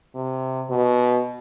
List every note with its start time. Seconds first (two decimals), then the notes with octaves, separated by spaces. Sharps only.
0.15 C3
0.70 B2